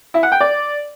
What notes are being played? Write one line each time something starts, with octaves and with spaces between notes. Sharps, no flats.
E4
F#5
G5
D5